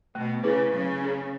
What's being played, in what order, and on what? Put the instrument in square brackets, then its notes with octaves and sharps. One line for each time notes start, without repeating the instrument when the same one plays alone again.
[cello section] B2 [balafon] A3
[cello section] C#3 [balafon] C#4 E4 G#4 B4
[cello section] C#3 [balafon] F#3
[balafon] C#4 G#4